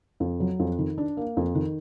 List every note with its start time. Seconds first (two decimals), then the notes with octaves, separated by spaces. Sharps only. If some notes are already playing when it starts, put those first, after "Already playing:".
0.20 F2
0.40 F#3
0.59 F2
0.79 D#3
0.98 D4
1.17 A#3
1.37 F2
1.55 D#3